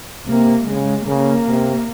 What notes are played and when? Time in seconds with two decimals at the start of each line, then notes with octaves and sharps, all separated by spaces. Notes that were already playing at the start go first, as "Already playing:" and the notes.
0.27 C3 A#3
0.67 C#3 G#3
1.07 C#3 A#3
1.46 C3